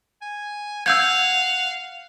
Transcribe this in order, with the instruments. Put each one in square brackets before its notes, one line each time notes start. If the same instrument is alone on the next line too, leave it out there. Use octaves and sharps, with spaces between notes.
[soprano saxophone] G#5
[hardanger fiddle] F5 [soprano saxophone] F#5 [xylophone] E6 G6 G#6